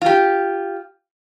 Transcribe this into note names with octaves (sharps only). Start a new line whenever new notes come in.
F4 G4